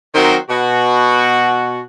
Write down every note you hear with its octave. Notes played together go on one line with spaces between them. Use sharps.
D#3 F#3 C4 F#4 A#4 C5
B2 F#4